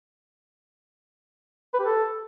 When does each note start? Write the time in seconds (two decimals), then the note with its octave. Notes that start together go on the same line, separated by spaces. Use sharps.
1.74 B4
1.79 G4
1.85 A4